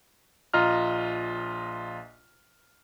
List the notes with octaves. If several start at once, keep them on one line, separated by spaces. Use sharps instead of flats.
A#1 F4 D#5 A#5 F6